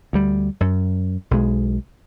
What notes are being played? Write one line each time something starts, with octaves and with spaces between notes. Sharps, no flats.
D2 G3
F#2
B1 G#3